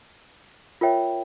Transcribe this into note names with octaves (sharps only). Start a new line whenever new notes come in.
F4 A#4 C#5 E5 G5